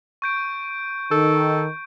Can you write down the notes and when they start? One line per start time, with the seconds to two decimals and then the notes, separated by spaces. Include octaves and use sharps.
0.22 C#6 G6 D7
1.11 D#3 A4